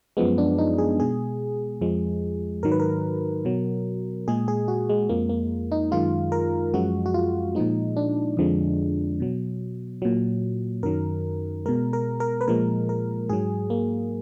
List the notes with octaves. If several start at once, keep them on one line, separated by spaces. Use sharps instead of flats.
F#2 F3 G#3 B3
D4
D#4
G#4
B2 G#3 G#4
F2 F3 G#3
G#2 D#3 F#3 A#4
B4
A#4
B2 F#3
A#2 G#3 G#4
G#4
F#4
G#3
F2 F3 G#3 A#3
A#3
D#4
F#2 D#3 G#3 F4
A#4
F#2 F3 G#3 F#4
F#4
F4
A#2 F3 G#3 D#4
D4
F2 D3 F3 G#3
B2 F#3
A#2 F#3
F#2 D#3 F#3 A#4
B2 G#3 A#4
A#4
A#4
B4
A#2 F3 G#3 A#4
A#4
G#2 F#3 G#4
A#3